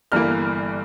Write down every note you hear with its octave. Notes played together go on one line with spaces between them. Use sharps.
G1 G2 E3 A#3 F6